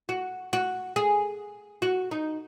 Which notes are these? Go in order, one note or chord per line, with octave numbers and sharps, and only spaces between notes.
F#4
F#4
G#4
F#4
D#4